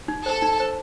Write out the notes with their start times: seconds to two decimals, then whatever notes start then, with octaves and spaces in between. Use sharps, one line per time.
0.08 D#4
0.26 A4 C5
0.42 D#4
0.60 C5